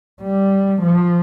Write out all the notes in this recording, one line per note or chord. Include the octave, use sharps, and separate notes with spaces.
G3
F3